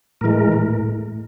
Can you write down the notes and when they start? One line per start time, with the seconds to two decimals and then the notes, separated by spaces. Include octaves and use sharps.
0.21 A2 E3 G#3 A#4
0.52 A2